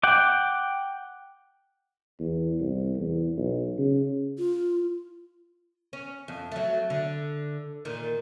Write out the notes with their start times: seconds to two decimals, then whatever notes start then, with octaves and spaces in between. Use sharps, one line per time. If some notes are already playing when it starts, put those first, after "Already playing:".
0.03 F#5 G5 D6
2.19 E2
2.60 C2
2.97 E2
3.37 B1
3.78 C#3
4.38 F4
5.93 C#4
6.28 F2
6.52 F#3 A3
6.90 D3
7.85 A#2 D#3